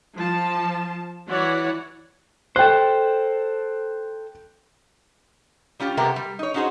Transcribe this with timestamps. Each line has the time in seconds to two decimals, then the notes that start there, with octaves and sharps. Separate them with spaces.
0.16 F3 A5
1.28 E3 F#4 C#5 D5 F#5
2.56 A4 C5 G5 F#6
5.80 G3 C#4 F4 G4
5.97 C3 A3 B3 G4 A#4
6.16 G3
6.39 D#4 C#5
6.54 C#4 D#4 F#4 G#4 C5